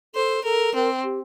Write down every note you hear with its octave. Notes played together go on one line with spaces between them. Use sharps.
A4 C5
A4 A#4
C4 A#4
G4